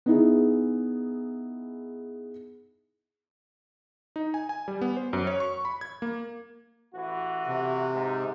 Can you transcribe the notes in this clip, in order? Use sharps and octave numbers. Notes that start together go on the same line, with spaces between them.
B3 D#4 E4 G#4
D#4
G#5
G#5
G3
B3
C5
F#2
C#5
C#6
B5
G#6
A#3
A1 E3 F#4
C3
G#2